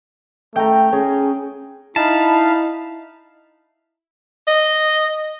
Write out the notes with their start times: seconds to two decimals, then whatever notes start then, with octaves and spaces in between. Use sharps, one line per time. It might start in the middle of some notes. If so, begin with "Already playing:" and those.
0.56 A3 G5 A#5
0.92 C#4 G#4
1.96 D#4 E4 F5 A5 B5
4.47 D#5